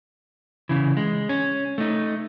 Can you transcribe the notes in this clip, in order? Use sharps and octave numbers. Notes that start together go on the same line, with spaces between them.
C#3 E3
G#3
C#4
A3 D#4